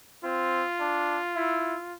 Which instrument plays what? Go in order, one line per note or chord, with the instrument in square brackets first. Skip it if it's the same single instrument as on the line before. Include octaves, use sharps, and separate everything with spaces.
[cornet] C4 [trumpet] F4
[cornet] D4
E4